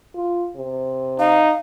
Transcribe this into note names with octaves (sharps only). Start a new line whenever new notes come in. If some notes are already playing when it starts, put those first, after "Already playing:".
F4
C3
D#4 F5